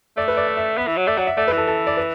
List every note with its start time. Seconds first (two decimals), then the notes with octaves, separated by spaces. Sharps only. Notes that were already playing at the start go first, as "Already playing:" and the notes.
0.17 A3 D5
0.28 B4
0.37 D5
0.47 E5
0.57 E5
0.78 B3 E5
0.87 E3
0.97 F#3
1.07 A3 D5
1.17 F#3 F#5
1.27 E5
1.37 A3 D5
1.47 B4
1.52 E3
1.57 A4
1.67 A4
1.87 D5
1.97 B4